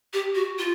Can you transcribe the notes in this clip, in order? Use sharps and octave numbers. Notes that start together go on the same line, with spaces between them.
G4
F#4
F4